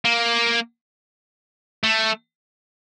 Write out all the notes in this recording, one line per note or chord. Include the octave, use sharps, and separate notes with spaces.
A#3
A3